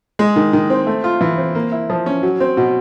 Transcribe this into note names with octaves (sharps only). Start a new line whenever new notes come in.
G#3
D#3
D#3
C4
A3
F4
E3
C4
A#3
E4
F3
C#4
F#3
C4
B2